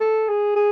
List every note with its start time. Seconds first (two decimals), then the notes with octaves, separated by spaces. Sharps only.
0.01 A4
0.29 G#4
0.56 G#4